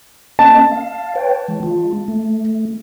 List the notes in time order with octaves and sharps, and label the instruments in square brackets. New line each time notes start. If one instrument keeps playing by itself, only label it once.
[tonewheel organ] A#3 C#4 D#5 [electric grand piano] A5
[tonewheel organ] F5
B4 C#5 G5
E3 G#3
G#3 F4
A3